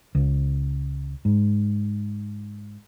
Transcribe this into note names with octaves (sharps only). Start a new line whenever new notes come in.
C#2
G#2